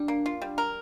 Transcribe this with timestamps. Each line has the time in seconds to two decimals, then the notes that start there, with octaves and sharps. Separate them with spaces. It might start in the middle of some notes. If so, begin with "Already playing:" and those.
Already playing: G3 D4
0.08 A#3
0.26 F4
0.42 G3
0.58 A#4